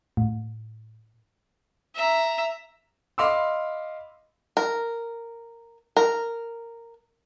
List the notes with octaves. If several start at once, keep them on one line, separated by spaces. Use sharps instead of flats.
A2
E5 A#5
D#5 F5 B5 C6 D6 E6
A#4
A#4